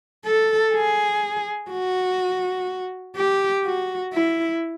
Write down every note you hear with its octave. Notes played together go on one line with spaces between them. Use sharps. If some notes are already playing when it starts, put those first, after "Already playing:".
A4
G#4
F#4
G4
F#4
E4